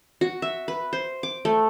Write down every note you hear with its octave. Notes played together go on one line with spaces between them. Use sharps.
F#4
E5
B4
C5
D6
A3